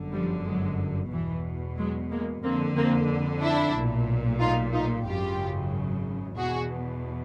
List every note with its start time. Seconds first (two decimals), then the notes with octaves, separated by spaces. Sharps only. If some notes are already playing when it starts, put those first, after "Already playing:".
Already playing: G1 F#2 D3
0.14 F3 G3
0.46 F#3 G#3
1.12 E2 B2 E3
1.77 F#3 G#3
2.11 G#3 A#3
2.43 F2 D3 A#3 C4
2.77 A#3 C4
3.42 D4 E4
3.75 B1 A#2
4.40 D#4 F4
4.74 D#4 F4
5.06 G#1 F#2 C#3 F4 G4
6.37 E2 B2 F#4 G#4